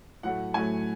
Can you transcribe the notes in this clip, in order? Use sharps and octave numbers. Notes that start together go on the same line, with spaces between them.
A2 F#3 A3 F#5
A2 F#3 A3 G#5